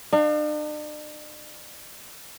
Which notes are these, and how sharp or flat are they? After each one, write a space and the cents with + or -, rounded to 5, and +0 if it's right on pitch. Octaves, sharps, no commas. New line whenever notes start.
D4 +45 F5 +0